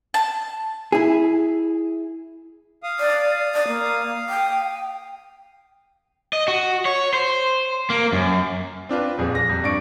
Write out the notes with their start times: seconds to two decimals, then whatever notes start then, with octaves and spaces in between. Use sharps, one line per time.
0.14 A5
0.92 E4 G#4
2.83 F5 D#6
3.00 D5
3.54 D5
3.68 A#3
4.29 G5
6.33 D#5
6.48 F#4
6.85 C#5
7.14 C5
7.90 A#3
8.13 F#2
8.89 C4 D4 F4 B4
9.18 D#1 F2 G#4
9.35 A#6
9.49 F2 C3 G3
9.63 G2 D5 C#6 D7